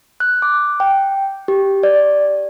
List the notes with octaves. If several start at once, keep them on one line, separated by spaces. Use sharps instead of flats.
F#6
D6
G5
G4
D5